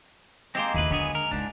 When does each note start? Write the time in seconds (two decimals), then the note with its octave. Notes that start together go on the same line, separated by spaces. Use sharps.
0.55 G#3 A#3 C4 G4 C5
0.74 F#1 D#2 E4 G#4 B4
0.90 D3 F#3 B3 G#4
1.15 A#4
1.31 C#2 G#2 D4